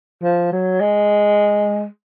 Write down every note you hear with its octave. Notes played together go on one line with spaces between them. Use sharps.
F3
F#3
G#3